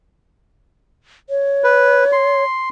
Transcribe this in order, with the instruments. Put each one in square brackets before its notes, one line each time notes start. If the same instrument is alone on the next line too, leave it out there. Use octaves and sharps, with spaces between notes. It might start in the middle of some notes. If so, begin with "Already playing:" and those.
[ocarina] C#5
[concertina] B4
C6